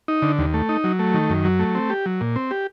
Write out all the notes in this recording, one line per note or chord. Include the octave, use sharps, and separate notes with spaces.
D#4
D3
D#2
A3
D#4
F#3
A3
D#3
F#2
F#3
A3
C4
G4
F#3
A#2
C4
G4